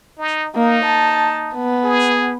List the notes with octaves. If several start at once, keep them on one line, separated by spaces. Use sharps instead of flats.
D#4
A#3 D#4
A5
B3
G#4